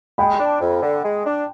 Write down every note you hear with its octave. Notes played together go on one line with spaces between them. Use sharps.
G#3 G5 B5
D4
F2
D3
G#3
D4